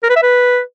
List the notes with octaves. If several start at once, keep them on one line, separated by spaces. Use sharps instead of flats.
A#4
B4
E5
B4